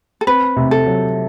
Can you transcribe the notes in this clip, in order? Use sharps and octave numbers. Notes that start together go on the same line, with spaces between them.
A4
C4 B4
C3
A4
F#3